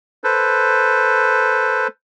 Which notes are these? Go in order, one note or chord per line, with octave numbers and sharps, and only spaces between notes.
A4 B4 C5